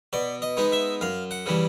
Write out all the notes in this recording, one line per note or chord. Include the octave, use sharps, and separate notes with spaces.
B2 D5
D#5
G#3 B3 D#4
E5
F#2 F5
F#5
C#3 E3 G3